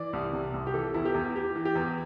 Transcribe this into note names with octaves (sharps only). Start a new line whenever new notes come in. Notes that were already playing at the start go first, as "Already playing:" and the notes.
Already playing: E3 D5
C2
C3
C2
G4
E3 A4
E2 E4
G4
E2
E3 G4
E3
G4
E2